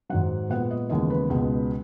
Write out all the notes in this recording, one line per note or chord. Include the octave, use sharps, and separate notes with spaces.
G#2 D#3 F#3 F#5
A#2 G#3 B3 F#5
D#5
D#2 C#3 E3 G#3 B3 D#5
B4
C#2 B2 G#3 B3